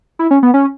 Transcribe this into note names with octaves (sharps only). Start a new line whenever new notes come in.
E4
C#4
B3
C#4